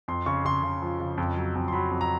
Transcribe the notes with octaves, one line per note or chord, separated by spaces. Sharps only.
F2 C6
C#3 C#6
C#3 C6
C#3
F3
C#3
F2
F#3
F2
C6
F#3 B5
F2
A#5